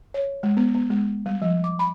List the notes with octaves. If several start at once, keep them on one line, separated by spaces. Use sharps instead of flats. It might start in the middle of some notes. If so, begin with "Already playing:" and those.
C#5
G#3
B3
B3
G#3
G3
F3
D6
B5